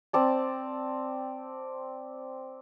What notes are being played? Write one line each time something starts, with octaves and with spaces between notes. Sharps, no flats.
C4 D5 A5